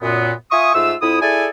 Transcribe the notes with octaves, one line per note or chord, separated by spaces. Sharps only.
F#2 A#2 B3
F4 E5 G#5 C#6 D#6
G#2 A3 F4 E6
F2 E4 D#6
E4 G#4 A4 D5 G#5 A5